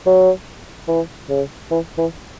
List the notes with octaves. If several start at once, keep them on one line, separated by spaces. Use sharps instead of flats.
F#3
E3
C#3
E3
E3